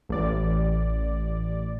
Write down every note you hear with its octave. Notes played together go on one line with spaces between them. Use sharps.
A1 D5